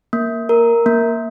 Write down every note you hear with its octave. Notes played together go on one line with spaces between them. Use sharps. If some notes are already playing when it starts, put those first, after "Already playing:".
A#3
A#4
A#3